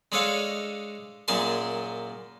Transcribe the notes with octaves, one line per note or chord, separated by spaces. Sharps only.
G#3 D4 A4 C#5 D#5 F5
F#2 A#2 G#4 G#5 A5 C6